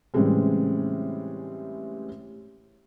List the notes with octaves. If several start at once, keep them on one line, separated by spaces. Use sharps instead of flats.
A2 C#3 E3 G3 G#3 C4